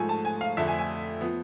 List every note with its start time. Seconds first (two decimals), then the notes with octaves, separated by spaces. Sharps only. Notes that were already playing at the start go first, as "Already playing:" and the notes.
Already playing: G#2 F3 A3 G#5
0.09 A5
0.25 G#5
0.41 F5
0.57 F2 D3 A3 E5
0.68 G#5
0.78 G#5
1.21 F3 B3